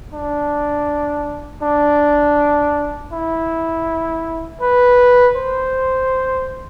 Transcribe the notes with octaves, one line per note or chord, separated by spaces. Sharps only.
D4
D4
E4
B4
C5